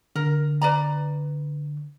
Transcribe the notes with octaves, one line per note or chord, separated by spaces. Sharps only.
D3 A#4
B4 D5 A#5